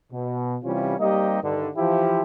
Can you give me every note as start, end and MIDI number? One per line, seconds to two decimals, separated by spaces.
0.12 0.57 47
0.64 0.95 48
0.64 0.95 52
0.64 0.95 55
0.64 0.95 61
0.64 0.95 65
1.00 1.42 55
1.00 1.42 58
1.00 1.42 60
1.00 1.42 63
1.00 1.42 67
1.00 1.42 75
1.43 1.68 43
1.43 1.68 50
1.43 1.68 51
1.76 2.22 52
1.76 2.22 53
1.76 2.22 64
1.76 2.22 67